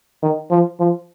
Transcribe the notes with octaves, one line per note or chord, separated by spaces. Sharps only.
D#3
F3
F3